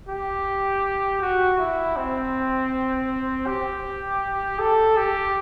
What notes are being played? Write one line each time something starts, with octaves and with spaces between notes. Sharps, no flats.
G4
F#4
E4
C4
G4
A4
G4